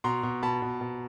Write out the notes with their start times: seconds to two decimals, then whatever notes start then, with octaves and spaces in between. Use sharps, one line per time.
0.04 B2 A#5 C6
0.23 B2
0.43 B2 A5 B5
0.62 B2
0.81 B2